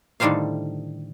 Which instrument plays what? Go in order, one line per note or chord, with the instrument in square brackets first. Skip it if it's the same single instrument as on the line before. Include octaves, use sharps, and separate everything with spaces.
[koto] A2 D3 D#3 G3 C5 F5